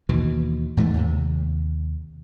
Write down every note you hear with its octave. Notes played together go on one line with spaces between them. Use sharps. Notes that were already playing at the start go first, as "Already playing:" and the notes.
D#2 B2 E3
E2 G#2 E3 A3
D#2 C3